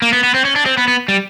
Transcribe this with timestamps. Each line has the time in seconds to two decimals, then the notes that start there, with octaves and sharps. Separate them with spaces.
0.02 A#3
0.13 B3
0.24 B3
0.34 C4
0.45 C#4
0.56 D4
0.66 C4
0.77 B3
0.88 B3
1.08 G3